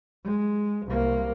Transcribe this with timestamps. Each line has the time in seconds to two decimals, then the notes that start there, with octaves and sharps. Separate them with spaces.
0.24 G#3
0.85 C2 A#3